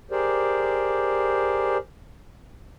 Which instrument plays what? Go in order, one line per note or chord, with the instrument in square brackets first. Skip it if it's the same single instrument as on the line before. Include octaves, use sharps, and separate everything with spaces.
[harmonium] G4 G#4 A#4 C5 D5